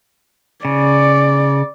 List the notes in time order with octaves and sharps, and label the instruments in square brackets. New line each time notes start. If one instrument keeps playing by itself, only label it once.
[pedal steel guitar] C#3 [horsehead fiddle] D5